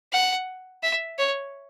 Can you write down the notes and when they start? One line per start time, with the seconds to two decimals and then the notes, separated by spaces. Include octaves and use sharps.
0.13 F#5
0.83 E5
1.19 C#5